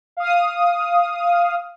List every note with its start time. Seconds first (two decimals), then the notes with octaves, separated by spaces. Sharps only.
0.17 F5 D#6